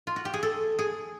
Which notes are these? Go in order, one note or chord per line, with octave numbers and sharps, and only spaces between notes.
F4
F#4
G4
G#4
A4
G#4